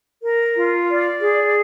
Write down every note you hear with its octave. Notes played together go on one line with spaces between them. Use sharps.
A#4
F4
D5
G#4